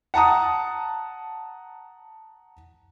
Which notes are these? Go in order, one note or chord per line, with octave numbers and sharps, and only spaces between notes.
F#5 A5 A#5 D#6